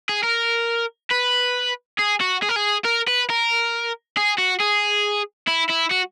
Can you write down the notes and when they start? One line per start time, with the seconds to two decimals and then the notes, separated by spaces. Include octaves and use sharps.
0.09 G#4
0.23 A#4
1.11 B4
1.99 G#4
2.21 F#4
2.42 G#4
2.49 A#4
2.56 G#4
2.85 A#4
3.08 B4
3.30 A#4
4.17 G#4
4.38 F#4
4.60 G#4
5.48 E4
5.70 E4
5.91 F#4